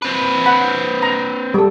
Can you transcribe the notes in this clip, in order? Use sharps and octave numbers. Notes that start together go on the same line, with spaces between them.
C4 B4
F#5 B5
A#5
G3 A4